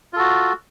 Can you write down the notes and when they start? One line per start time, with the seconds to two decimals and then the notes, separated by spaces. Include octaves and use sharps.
0.13 F4
0.16 A4
0.19 F#4